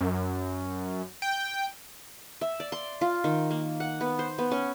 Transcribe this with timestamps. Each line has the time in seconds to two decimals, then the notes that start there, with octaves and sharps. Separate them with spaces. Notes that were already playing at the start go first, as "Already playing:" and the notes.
0.01 F#2
1.22 G5
2.41 E5
2.60 D5
2.72 C6
3.01 F4
3.24 D#3
3.51 A#3
3.80 F#5
4.01 B3
4.19 C5
4.38 B3
4.51 C#4